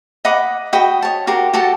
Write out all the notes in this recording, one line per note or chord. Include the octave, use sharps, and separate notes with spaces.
D#5 F#5 B5 D6
F#4 D#5 G5 B5
C#5 A5
F#4 G4 A#4 C6
F#4 G4 A4 A5